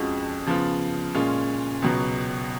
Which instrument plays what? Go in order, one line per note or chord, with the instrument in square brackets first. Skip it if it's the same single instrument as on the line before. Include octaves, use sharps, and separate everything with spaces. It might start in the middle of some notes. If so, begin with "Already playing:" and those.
Already playing: [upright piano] F2 F3 G#3 C#4 F#4
C#3 F3 B3 F4
A#2 G#3 C#4 F4
C#2 B2 F#3 B3